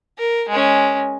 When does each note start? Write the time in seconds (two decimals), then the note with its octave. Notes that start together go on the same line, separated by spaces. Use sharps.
0.18 A#4
0.49 G#3 C#4